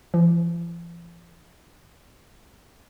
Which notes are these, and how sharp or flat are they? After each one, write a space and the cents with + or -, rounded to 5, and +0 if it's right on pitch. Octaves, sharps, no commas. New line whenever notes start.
F3 -45